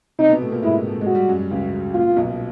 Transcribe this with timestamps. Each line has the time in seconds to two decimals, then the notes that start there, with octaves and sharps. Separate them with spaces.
0.19 C3 C4 D#4
0.29 B2 B3
0.41 A2 A3
0.52 A#2 A#3
0.62 G#2 G#3 E4
0.88 A3
1.01 G#3
1.06 F#4
1.15 G3
1.29 F#2 F#3
1.50 C#2 C#3
1.94 A#2 F4
2.11 A#2
2.16 B1 B2